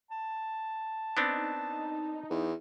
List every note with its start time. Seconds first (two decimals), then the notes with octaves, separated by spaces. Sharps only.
0.11 A5
1.17 B3 C4 D4 D#4
2.30 E2